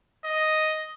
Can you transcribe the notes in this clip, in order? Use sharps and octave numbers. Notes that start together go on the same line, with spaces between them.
D#5